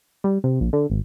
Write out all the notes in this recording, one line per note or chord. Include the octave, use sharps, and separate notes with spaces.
G3
C3
A#1
D3
G#1